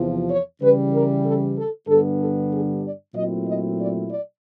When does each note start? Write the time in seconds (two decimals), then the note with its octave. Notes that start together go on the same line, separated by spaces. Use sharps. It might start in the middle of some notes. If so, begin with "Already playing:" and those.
Already playing: E2 C3 F3
0.30 C#5
0.61 C#3 E3 G3 B4
0.94 A#4
1.24 A4
1.57 A4
1.88 G2 D3 G3 B3 D4 A4
2.20 A4
2.52 G#4
2.83 D5
3.14 A#2 F#3 A3 C4 E4 D#5
3.47 D#5
3.78 D5
4.10 D5